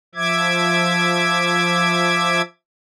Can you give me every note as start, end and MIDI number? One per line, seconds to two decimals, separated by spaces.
0.15 2.42 53
0.15 2.42 76
0.15 2.42 86
0.15 2.42 92